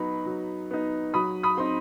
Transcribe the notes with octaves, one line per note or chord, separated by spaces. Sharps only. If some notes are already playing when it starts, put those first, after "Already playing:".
Already playing: F#3 B3 D#4 B5
F#3
B3 D#4
F#3 B5 D#6
B5 D#6
C4 D#4 C6